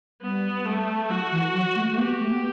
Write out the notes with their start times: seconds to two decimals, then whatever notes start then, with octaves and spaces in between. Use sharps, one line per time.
0.22 G3 B3
0.66 A3
1.09 F#3 F#4
1.32 E3
1.53 F#3
1.75 A3
1.91 A3
1.97 B3 G4
2.20 A3
2.30 B3